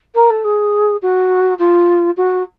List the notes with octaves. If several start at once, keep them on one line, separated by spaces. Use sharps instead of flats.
A#4
A4
G#4
F#4
F4
F#4